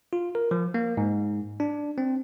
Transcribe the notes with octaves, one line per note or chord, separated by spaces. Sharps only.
F4
A#4
F3
A#3
G#2
D4
C4